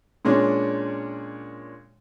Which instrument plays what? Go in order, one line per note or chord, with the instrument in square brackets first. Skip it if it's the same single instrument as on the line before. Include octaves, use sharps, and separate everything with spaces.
[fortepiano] A#2 G#3 C#4 D4